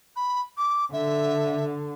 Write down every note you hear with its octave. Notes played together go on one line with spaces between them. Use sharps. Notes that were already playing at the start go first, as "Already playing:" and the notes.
B5
D6
D3 E5